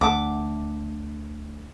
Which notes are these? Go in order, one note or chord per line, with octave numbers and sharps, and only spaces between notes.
D2 E5 F#5 A5 D6